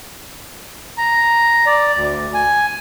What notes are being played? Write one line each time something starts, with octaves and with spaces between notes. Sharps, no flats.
A#5
D5
D2
G#5